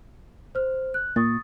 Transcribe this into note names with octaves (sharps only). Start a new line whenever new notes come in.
C5 F6
F#6
A#2 C#6 D#6 A6